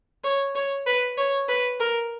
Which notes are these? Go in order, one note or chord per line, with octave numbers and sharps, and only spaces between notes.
C#5
C#5
B4
C#5
B4
A#4